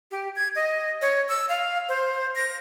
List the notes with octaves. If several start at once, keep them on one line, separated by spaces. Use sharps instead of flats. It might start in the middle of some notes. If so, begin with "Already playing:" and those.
G4
G#6
D#5
C#5
E6
F5
C5
A#6